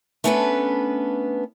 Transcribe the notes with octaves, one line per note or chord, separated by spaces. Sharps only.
A3 B3 C#4 D4 A4 B4